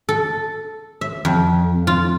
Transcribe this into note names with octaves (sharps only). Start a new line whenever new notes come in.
A4
E5
F2
F4